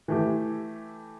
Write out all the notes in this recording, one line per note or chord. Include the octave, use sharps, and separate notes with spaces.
E3 A3 G4